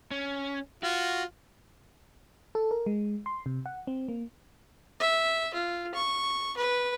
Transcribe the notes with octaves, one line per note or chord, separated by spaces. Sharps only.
C#4
F4 F#4
A4
A#4
G#3
C6
C3
F#5
C4
A#3
E5
F4
C#6
B4